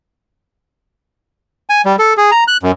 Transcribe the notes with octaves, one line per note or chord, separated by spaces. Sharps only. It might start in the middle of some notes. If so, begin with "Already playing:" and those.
G#5
G3
A4
G#4
A#5
F#6
F#2